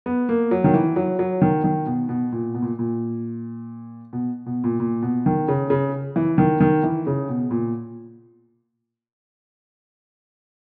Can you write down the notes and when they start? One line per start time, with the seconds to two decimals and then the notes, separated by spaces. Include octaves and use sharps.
0.06 B3
0.29 A#3
0.51 F#3
0.64 D#3
0.74 E3
0.96 F#3
1.19 F#3
1.42 D#3
1.64 D#3
1.86 B2
2.09 B2
2.32 A#2
2.54 B2
2.62 A#2
2.79 A#2
4.13 B2
4.46 B2
4.64 A#2
4.80 A#2
5.02 B2
5.26 D#3
5.48 C#3
5.70 C#3
6.16 E3
6.38 D#3
6.60 D#3
6.83 E3
7.07 C#3
7.29 B2
7.51 A#2